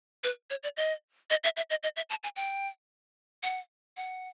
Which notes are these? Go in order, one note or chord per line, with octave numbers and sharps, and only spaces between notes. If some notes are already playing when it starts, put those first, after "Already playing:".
B4
C#5
D5
D#5
D#5
E5
E5
D#5
D#5
E5
A5
G#5
G5
F#5
F#5